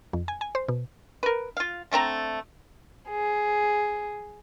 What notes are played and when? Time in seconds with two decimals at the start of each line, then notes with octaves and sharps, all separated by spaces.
0.13 F2
0.28 G#5
0.41 G#5
0.55 C5
0.68 B2
1.23 A#4 B4
1.57 F4 F5
1.91 D3 A3 C4 A#5
3.10 G#4